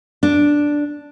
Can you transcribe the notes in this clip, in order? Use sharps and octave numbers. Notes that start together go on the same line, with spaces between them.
D4